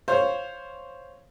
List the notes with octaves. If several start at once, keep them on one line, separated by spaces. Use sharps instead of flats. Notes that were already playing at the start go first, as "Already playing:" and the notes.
C5 C#5 F5